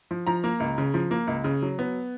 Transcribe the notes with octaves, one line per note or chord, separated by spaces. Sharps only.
F3
F3 A#5
A#3
C#2
C#3
F3
A#3
C#2
C#3
F#3
B3